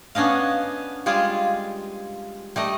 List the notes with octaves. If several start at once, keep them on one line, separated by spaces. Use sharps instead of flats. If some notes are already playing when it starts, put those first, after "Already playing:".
B3 C#4 D4 D#5 F5
G3 G#3 F4 G#4
G3 A3 D#5